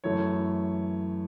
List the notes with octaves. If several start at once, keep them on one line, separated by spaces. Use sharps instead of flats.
F#2 E3 A3 C#5